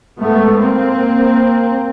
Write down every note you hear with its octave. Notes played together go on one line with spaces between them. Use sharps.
G#2 A3 B3
A#3 C4